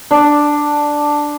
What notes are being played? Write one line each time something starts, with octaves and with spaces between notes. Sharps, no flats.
D4